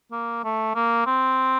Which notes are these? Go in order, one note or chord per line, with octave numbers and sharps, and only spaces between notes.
A#3
A3
A#3
C4